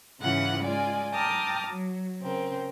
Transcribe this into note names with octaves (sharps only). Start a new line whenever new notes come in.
G#2 C#3 E3 F4 F#5 F#6
G#3 F4 D5 G#5
G5 A5 A#5 D6 D#6 F6
F#3
C#3 C4 A#4